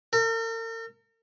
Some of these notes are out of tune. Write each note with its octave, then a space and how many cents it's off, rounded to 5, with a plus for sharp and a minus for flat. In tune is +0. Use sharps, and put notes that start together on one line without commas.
A#4 -45